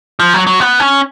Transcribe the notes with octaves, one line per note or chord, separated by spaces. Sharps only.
F3
F#3
F#3
B3
C#4